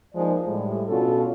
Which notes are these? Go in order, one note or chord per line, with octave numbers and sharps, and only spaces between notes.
F3 G#3 A#3 D#4 G#4 D5
A2 G3 G#3
B2 C#4 D4 F4 F#4 A4